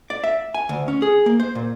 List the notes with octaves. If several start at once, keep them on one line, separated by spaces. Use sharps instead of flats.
D5
E5
G#5
D2
C#4
G#4
A#3
C5
A#2